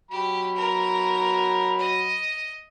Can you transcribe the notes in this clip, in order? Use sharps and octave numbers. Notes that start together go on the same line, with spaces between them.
F#3 G4 B5
A#4
D#5